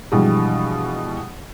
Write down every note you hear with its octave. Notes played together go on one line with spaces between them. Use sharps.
G2 B2 E3 F3 G3 G#3